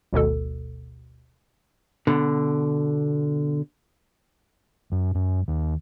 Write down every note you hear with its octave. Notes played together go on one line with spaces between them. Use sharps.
G#1 D2 B2 A4
B2 D3
F#2
F#2
D#2